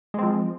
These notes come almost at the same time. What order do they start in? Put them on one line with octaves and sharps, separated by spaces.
G#3 C4 F3